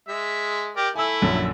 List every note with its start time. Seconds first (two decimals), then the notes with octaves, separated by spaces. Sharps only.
0.08 G#3 E5
0.77 G4 A#4 D5
0.95 A3 E4 G#5 E6
1.22 A#1 F#2 D3